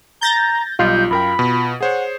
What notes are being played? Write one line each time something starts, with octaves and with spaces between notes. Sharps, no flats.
A#5 G6 A6 A#6
B1 G3 F4 D#5 G6
F#2 A#4 G5 B5
B2
G#4 C5 C#5 F#5